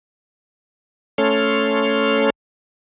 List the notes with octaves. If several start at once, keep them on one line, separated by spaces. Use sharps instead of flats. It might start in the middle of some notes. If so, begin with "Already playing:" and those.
A3 C#4 A4 C#5 C6 F6